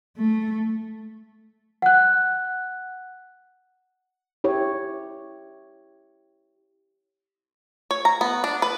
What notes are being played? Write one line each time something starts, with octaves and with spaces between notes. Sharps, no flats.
A3
F#5 F#6
E4 G4 C#5
C#5
A#5
B3
D4
B4